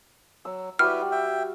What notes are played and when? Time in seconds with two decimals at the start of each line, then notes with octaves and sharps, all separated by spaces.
0.45 F#3 E6
0.79 G3 E4 F#4 G4 B4 F6
1.12 E5 G5